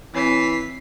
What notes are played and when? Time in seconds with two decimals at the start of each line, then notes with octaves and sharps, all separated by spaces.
0.15 E3 C4 C#5 B6 C7